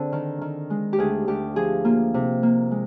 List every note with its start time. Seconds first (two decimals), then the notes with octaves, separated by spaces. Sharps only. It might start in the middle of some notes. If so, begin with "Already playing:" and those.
Already playing: D3 C4 G#4 C5
0.12 D#3
0.41 D#3
0.70 G#3
0.93 G4
0.98 D2 G#4
1.28 D2 G4
1.56 F3 G#4
1.85 A#3 F4
2.14 C3
2.43 A#3
2.71 G#3